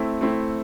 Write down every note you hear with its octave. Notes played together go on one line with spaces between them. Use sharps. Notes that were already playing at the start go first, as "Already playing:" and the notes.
Already playing: A3 C4 E4
A3 C4 E4